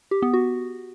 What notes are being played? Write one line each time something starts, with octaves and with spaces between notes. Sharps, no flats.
G4
B3
F#4